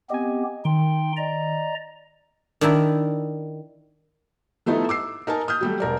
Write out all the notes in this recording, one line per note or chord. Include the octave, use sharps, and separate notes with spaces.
B3 C4 G4 D#5 G#5
D#3 D#4 G5 C6
D5 D#5 A#5
D#3 D4 E4 A#4
F3 A3 B3 D#4 E4
D6 E6 C7
D#4 A#4 G#5 A5
D#6 F6 G6
F#3 G3 A3
E1 A#4 D5